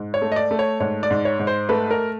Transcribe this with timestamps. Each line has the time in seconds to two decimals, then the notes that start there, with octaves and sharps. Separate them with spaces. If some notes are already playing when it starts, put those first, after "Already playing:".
Already playing: G#2
0.14 C#5
0.22 A3
0.32 D#5
0.36 D5
0.51 A3
0.59 C#5
0.80 G#2 C#5
1.03 D5
1.11 G#2
1.25 C#5
1.39 G#2
1.47 C5
1.69 A3 B4
1.91 A#4